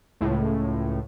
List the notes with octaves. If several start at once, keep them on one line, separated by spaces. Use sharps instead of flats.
C#2 A2